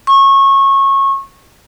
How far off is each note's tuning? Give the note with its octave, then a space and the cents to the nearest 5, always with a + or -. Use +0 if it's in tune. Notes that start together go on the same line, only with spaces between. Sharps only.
C#6 -25